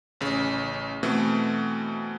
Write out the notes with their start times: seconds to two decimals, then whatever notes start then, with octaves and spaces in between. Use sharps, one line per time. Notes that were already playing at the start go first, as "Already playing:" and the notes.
0.21 A1 C#3
1.03 B2 E3 A3 C4